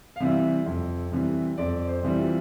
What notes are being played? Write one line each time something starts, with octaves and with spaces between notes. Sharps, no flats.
F5
C3 E3 G3 E5
F2
C3 E3 G3
F2 D5
C5
C3 E3 G3
F4